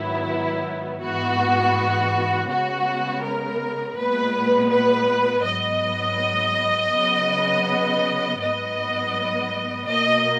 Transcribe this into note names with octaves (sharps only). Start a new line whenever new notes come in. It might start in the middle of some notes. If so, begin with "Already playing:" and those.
Already playing: G#2 D#3 F#3 B3 E4
G#2 E3 B3 F#4
C#3 G#3 B3 F#4
A#4
A#2 G#3 B3 B4
B4
G#2 F#3 B3 D#5
C#3 F#3 B3
G#2 F#3 B3 D#5
B2 A#3 D#5